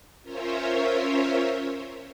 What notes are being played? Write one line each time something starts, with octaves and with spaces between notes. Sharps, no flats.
C#4 F4 A#4 C5 C#5 E5